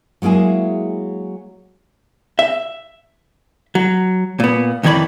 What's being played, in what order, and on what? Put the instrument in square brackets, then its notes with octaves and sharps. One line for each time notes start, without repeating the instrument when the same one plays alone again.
[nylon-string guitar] F#3 G#3 A#3 E4 G#4
[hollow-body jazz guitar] E5
F#3
A#2 B3
F2 D#3 E3 C#5 D5 B5